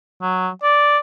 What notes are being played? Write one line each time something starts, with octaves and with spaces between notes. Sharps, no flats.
F#3
D5